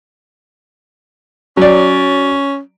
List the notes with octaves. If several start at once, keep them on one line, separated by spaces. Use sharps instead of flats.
F#3 C#4 D5